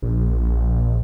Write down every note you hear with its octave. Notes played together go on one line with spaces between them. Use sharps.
A#1